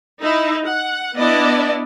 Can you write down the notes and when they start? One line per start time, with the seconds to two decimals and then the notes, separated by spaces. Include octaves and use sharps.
0.20 D#4 E4
0.65 F#5
1.16 B3 D4 E4 D5 D#5